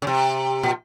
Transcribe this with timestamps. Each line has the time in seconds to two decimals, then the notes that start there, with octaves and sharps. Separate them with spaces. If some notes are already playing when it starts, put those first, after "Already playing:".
0.02 C#3
0.07 C3
0.63 A#2